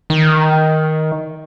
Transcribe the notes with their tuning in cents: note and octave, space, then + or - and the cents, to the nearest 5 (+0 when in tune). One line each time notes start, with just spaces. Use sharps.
D#3 +10